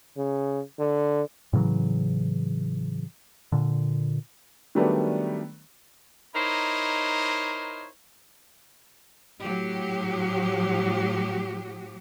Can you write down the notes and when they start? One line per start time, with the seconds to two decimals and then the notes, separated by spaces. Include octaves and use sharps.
0.17 C#3
0.79 D3
1.53 A2 C#3 E3 F#3
3.52 A#2 D3
4.75 D#3 F#3 G3 A3 B3 D4
6.35 D#4 E4 A#4 C5 C#5 D#5
9.40 A2 F#3 G4